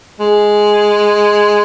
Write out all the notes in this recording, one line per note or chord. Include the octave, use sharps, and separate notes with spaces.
G#3